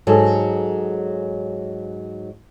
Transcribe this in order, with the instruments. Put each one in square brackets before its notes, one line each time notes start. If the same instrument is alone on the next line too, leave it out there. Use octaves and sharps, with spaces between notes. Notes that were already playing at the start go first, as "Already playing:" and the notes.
[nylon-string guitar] G#2 F#3 G#4 A4